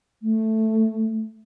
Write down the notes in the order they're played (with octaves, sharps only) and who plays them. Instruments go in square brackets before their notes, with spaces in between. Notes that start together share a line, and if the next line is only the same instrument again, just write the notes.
[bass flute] A3